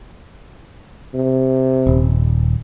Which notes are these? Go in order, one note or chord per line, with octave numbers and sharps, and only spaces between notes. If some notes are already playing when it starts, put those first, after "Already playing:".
C3
D#1